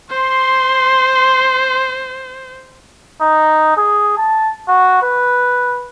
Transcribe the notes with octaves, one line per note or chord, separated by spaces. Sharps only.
C5 C6
D#4
G#4
A5
F#4
B4